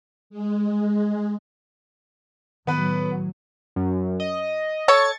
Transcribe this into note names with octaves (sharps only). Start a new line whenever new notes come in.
G#3
A2 D#3 F#3 B3 B4
F#2
D#5
A4 C#5 C#6 A6 C#7